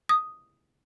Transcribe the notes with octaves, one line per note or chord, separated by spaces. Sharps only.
D#6